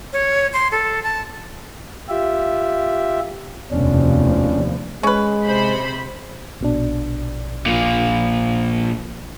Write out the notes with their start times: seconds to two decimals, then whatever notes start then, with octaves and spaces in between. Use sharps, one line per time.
0.13 C#5
0.53 C6
0.72 A4
1.03 A5
2.09 F4 G4 E5
3.71 F1 D#2 B2 F3 C#4 D4
5.03 G#3 C#4 B4
5.44 C3 C5 B5
6.61 A#1 B2 D4
7.66 A#2 F3